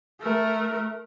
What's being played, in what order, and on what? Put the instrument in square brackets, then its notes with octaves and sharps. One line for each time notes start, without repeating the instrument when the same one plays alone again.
[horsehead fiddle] A3 A#4